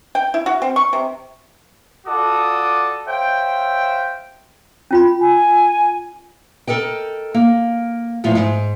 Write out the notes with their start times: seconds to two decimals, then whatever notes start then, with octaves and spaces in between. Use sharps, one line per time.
0.15 G5
0.34 E4
0.46 F#4
0.62 C4
0.76 C#6
0.93 C3
2.06 F4 F#4 A4 D5 D6 D#6
3.07 C5 C#5 E5 F5 G5
4.91 C#4 F4 B5
5.21 G#5
6.67 A4 A#4 D#5 G5
7.34 A#3
8.24 E2 A2 F3 E4 F5
8.35 G#2